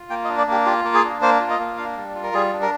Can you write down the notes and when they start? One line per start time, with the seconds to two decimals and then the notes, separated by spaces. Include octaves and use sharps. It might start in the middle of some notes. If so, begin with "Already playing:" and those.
Already playing: F4
0.10 A#3 G5
0.25 D#5
0.28 D4
0.38 D5
0.47 A#3 G4
0.65 F4 G4
0.85 A#3
0.94 G#4
1.04 D4
1.22 A#3 C5
1.40 F4
1.50 D#5
1.59 A#3
1.78 D4 F5
1.97 G3
2.15 F4
2.23 A#4
2.34 G3 G#4
2.53 D4
2.62 A#4